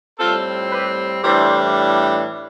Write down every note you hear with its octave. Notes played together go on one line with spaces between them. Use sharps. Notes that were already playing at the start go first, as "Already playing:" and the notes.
A2 G3 C4 F4 A4
G4 B4
A2 E3 G3 D4 A4 C5